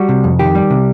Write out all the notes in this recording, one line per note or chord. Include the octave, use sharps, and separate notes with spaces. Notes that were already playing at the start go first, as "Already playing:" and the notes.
Already playing: G3 F#4
C3
F2
D#3 G4
G3
C3